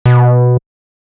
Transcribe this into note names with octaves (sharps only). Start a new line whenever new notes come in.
B2